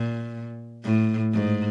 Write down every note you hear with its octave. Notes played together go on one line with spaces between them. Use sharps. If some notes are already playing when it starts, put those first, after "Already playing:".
Already playing: A#2
A2
G#2